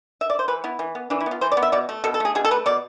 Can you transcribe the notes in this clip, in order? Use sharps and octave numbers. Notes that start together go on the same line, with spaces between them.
E5
D5
C5
E3 B4
B3 E4
E3
B3
E3 D4
E4
B3
F4
E3 C5
D5
B3
E5
B2 D5
A3
B2 A4
A4
A3 G#4
B2 G#4
A4
A3 B4
B2 D5